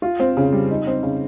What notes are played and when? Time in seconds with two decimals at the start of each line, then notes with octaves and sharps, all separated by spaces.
0.02 F4
0.20 C4
0.37 C#3
0.53 G3
0.71 D#4
0.87 C4
1.03 C#3